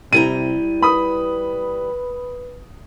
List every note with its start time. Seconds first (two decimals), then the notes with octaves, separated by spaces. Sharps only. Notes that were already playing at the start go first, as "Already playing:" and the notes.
0.13 C3 G3 E4 A#5 D#7
0.82 B4 B5 D#6